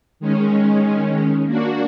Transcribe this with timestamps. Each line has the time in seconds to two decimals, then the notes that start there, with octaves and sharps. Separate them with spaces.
0.20 D#3 G#3 C#4
1.46 A#3 D4 F#4